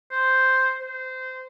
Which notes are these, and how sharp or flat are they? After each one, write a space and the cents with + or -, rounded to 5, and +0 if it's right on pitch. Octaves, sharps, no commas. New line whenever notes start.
C5 +0
C5 -20